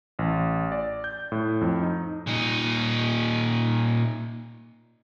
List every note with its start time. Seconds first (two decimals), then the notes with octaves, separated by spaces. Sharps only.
0.19 A1
0.72 D5
1.04 G6
1.32 A2
1.61 F2
1.83 D#4
2.27 A#2 D#4